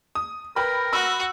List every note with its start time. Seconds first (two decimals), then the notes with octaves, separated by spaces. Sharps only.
0.15 D#6
0.56 A#4 B4 G5 B5
0.93 F#4 B5 E6 F#6